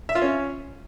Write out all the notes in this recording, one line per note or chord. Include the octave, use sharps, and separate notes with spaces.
E5
F4
C#4